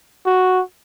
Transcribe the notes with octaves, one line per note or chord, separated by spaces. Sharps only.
F#4